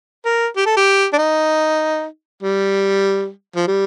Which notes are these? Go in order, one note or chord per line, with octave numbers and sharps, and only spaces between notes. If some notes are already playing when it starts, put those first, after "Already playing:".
A#4
G4
A4
G4
D4
D#4
G3
F3
G3